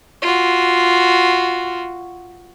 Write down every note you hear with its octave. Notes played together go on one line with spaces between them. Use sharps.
F4 F#4